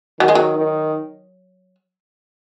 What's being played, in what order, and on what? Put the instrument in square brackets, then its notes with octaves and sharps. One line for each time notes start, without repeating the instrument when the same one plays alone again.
[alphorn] D#3 [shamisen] F#3
[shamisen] G#3
F#3
[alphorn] D#3